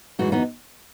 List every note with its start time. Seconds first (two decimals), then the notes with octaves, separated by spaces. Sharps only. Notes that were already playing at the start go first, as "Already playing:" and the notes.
0.19 F#2 E3 G#3 D#4 F#4
0.32 B3 D#4